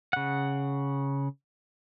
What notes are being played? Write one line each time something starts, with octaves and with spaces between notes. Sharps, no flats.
C#3 F#5